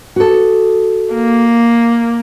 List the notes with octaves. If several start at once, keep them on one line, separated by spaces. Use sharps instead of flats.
F#4 A4
A#3